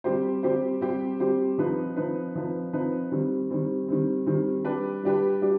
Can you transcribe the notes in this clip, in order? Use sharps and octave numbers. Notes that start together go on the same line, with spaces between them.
G3 C4 G4 C5
G3 C4 G4 C5
G3 C4 G4 C5
G3 C4 G4 C5
F3 C4 D#4 B4
F3 C4 D#4 B4
F3 C4 D#4 B4
F3 C4 D#4 B4
D#3 G3 C4
D#3 G3 C4
D#3 G3 C4
D#3 G3 C4
G3 D4 G4 B4
G3 D4 G4 B4
G3 D4 G4